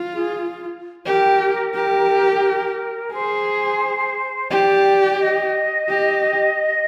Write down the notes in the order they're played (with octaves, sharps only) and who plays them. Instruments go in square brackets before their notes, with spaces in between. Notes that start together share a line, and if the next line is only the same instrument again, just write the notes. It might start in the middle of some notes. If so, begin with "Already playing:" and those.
Already playing: [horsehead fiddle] F4
[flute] G#4
[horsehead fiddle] G4 [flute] A#4
[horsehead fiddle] G4
[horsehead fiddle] G#4 [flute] C5
[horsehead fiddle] G4 [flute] D5
[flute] D#5
[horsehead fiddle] G4